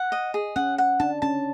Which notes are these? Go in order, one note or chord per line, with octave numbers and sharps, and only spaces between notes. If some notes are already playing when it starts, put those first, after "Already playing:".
Already playing: F#5
D#5
G#4
C#4 F#5
F#5
D4 A5
C#4 A5